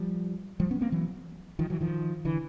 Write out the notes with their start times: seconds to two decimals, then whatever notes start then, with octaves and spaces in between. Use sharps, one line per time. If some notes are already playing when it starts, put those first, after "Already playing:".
Already playing: F3 G3
0.60 F3 G3
0.71 B3 C#4
0.81 A#3 C4
0.92 E3 F#3
1.59 D#3 F3
1.70 E3 F#3
1.81 D#3 F3
2.25 D3 E3